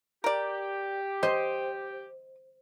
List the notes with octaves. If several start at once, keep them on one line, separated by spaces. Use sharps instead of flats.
G4 A#4 D5
C5 D#5